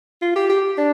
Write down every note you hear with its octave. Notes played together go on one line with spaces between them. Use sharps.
F4
G4
G4
D4